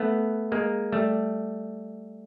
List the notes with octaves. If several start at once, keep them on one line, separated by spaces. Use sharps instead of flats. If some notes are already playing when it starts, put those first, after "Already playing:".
Already playing: A3 B3
G#3 A#3
G3 A3